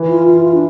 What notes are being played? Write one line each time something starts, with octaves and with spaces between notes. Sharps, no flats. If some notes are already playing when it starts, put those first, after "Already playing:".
Already playing: E3
F4
E3 F4
F4
D4